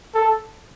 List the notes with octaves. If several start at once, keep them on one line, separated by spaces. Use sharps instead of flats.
A4